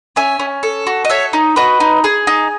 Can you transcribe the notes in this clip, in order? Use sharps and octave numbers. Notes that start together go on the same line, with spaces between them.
C#4 E5 G#5
C#4
A4
F#4
D#5
A4 C#5 E5
D#4
F#4 B4 D#5
D#4
G#4
D#4